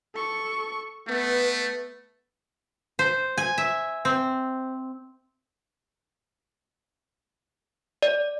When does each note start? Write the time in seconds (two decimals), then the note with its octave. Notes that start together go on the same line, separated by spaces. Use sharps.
0.15 A4 C#6
1.07 A3 B3 B4
2.99 C5
3.38 G#5
3.58 E5
4.05 C4
8.03 D5